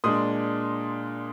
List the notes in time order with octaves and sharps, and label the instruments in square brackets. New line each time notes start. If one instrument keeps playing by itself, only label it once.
[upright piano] A#2 G#3 D4 C6 D#6